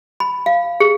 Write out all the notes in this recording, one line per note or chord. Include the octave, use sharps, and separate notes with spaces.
B5
F5
G#4